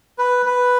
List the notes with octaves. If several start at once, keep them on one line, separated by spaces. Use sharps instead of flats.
B4
B4